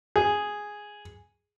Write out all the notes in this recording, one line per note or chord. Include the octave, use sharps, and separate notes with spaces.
G#4